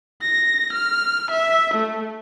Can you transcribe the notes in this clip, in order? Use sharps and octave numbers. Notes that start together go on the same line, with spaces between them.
A#6
F6
E5
A3